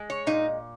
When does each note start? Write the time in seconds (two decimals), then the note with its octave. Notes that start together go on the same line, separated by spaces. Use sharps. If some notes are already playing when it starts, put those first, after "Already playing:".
Already playing: G#3
0.10 C#5
0.27 A#2 D#4